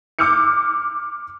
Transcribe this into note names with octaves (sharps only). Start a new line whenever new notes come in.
D6 E6 F6 G6 C#7